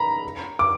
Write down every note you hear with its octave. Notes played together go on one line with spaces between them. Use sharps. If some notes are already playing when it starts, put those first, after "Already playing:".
Already playing: A#5 B5
D6